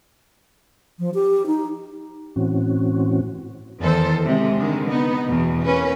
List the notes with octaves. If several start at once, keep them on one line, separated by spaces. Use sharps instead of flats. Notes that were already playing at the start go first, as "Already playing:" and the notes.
F3
G4
D#4
A2 E3 C4 C#4 F#4
E2 D#3 A4 C5
C3 G#3
D3 D#3 G#3
B3 D#4
E2 B2
A#3 C#4 B4